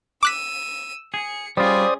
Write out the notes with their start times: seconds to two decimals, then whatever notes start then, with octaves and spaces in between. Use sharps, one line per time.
0.23 D6 E6 F#6 B6 D#7
1.14 G#4 C#7
1.57 G3 C#4 F4 G#4 C5 D5 D#6